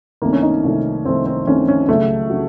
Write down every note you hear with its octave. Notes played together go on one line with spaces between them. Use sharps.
C2 C3 D#3 A3 A#3
C#4
D#4
C2 C3 D#3 A3
C2 C3 D#3 A3 C4
C4
C2 C3 D#3 A3 C#4
C#4
C#2 C#3 F#3 A3
C#3 F#3 F#4